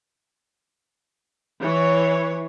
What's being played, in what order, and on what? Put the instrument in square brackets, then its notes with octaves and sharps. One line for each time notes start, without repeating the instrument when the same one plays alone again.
[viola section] E3 C#5